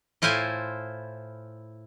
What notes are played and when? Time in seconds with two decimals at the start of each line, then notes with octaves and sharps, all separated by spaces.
0.22 A2 E4 F4 C5 G#5